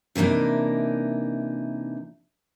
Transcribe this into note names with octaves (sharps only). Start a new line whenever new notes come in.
C3 E3 A#3 D4 D#4